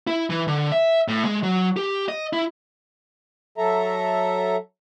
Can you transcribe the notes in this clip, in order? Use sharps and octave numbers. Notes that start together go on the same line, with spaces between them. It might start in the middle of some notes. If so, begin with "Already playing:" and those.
E4
E3
D3
E5
A2
G#3
F#3
G4
D#5
E4
F#3 A4 E5 A#5